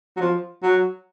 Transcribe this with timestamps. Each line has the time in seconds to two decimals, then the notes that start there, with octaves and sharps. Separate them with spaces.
0.17 F#3
0.20 F3
0.63 F#3